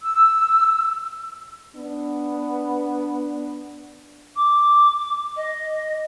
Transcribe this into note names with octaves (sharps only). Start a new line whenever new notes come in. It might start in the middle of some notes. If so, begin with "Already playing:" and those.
E6
B3 D4
D6
D#5